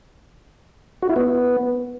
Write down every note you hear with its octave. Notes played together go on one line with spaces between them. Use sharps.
F#4
E4
B3